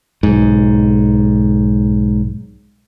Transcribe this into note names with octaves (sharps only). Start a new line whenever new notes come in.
B1 G#2